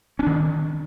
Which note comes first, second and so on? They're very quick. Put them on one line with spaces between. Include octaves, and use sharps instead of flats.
C#4 D4 D#3